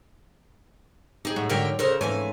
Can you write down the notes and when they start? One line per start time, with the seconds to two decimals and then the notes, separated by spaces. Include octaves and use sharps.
1.25 D#4 G4 G#4
1.36 A2 F#4
1.49 G#2 D3 F#3 A#4 E5 G5
1.79 C#3 A4 A#4 C5
2.01 F2 G#2 E3 A3 C#4 G#5